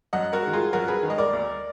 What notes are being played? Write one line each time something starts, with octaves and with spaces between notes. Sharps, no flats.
F#2 D#5 F#5
F#4 A#4
D#3 G#3
F4 G#4
F#2 F#4 A#4
G#4 B4
D#3
G#3 D#5
A#4 D5
D2